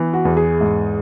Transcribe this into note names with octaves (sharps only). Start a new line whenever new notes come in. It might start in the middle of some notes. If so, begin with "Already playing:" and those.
Already playing: E3 B3
F#4
E2
G#4
G#2